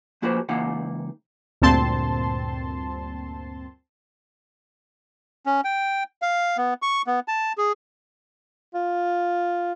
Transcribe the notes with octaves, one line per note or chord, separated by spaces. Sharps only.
F3 A#3 F#4 G#4 B4 C5
C#2 E3 A#3 D#4 F5 F#5
D2 G2 A#2 C4 A5 C6
C#4
G5
F5
B3
C#6
B3
A5
G#4
F4